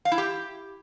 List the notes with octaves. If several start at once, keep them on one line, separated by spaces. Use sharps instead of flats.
F5
E4
G4